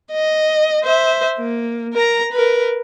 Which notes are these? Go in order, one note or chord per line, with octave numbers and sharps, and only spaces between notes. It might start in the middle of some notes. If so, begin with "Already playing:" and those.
D#5
C5 E5
A#3
A#4 A#5
A#4 B4